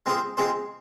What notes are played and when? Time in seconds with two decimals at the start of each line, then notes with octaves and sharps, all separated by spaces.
0.06 G#3 C4 F4 G#4 C5
0.37 G#3 C4 F4 G#4 C5